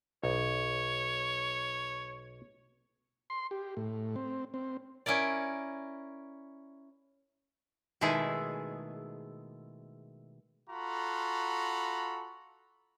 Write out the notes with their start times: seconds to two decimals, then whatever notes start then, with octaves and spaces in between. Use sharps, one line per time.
0.24 B1 C#5
3.30 C6
3.51 G4
3.77 A2
4.16 C4
4.54 C4
5.06 C#4 E4 A#4 D5
8.01 B2 D#3 G#3 A3 E4 G#4
10.70 F4 F#4 A4 A#5 B5